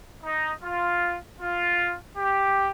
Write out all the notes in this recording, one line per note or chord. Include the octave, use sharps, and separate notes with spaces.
D#4
F4
F4
G4